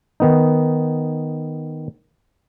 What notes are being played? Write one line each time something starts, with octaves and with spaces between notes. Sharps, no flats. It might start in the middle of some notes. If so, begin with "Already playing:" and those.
D#3 B3 D#4